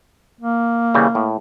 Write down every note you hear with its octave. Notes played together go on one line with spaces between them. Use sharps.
A#3
C#3 E3 G3
A2